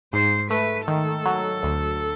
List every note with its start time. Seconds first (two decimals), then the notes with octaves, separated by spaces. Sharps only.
0.13 G#2 C5
0.50 A3 B4
0.88 D#3 A4
1.26 F#3
1.63 D2